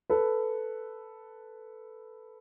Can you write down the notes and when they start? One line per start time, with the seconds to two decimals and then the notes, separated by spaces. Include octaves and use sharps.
0.10 A4 B4